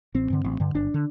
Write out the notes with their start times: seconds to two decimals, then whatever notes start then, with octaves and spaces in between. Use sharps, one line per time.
0.14 A1 C4
0.30 G2 D3
0.44 A1
0.60 G2 D3
0.74 G1 D4
0.94 D3